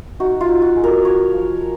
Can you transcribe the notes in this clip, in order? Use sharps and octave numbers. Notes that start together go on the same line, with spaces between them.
D#4 F#4
F4
D#4
F#4
G#3
A#4
F3 C#5
F3